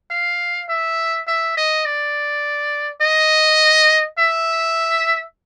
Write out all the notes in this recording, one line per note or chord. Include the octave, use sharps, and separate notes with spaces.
F5
E5
E5
D#5
D5
D#5
E5